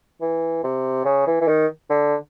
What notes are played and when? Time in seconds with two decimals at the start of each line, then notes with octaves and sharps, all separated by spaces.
0.21 E3
0.64 C3
1.05 C#3
1.27 E3
1.41 E3
1.48 D#3
1.90 D3